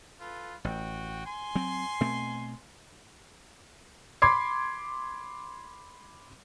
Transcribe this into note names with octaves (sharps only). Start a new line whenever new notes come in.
F4 A4 B4
A1 F#4 G5
G#5 C6
F#3 C4
B2 A3 C4
B5 C6 D6 G#6 C7